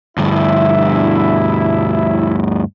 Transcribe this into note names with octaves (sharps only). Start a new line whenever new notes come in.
D2 G2 E4